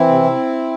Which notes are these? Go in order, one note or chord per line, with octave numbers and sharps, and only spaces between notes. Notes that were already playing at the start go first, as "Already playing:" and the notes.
Already playing: E3 C4 E4
C3
C3